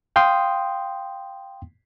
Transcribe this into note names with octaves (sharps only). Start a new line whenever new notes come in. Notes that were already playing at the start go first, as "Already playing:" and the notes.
F5 G5 C6 D#6